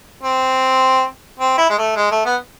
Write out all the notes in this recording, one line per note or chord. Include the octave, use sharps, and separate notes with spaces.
C4
C4
E4
G#3
A3
G#3
A3
B3